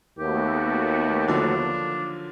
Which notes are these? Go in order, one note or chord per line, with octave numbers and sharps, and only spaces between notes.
D#2 A3 B3 F#4 G4
D3 F3 F#3 D4